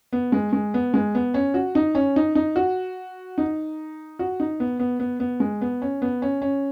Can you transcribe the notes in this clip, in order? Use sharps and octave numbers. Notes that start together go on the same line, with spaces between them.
B3
G#3
G#3
B3
G#3
B3
C#4
F#4
D#4
C#4
D#4
D#4
F#4
D#4
F#4
D#4
B3
B3
B3
B3
G#3
B3
C#4
B3
C#4
C#4